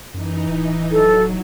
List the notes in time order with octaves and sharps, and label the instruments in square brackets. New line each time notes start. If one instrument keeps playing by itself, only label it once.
[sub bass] F#2 [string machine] E3 D#4
[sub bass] D1
[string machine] F#3 [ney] A4